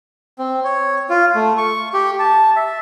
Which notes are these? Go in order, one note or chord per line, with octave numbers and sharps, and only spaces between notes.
C4
C#5
F4
A3
C#6
G4
A5
E5